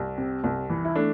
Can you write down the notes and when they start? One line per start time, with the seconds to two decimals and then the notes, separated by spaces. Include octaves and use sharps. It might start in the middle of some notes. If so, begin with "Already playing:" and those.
Already playing: C2 C4
0.18 C3
0.44 C2
0.70 E3
0.85 E4
0.96 A3 D4